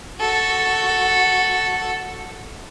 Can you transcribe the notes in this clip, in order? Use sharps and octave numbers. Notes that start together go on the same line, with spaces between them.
F#4 A4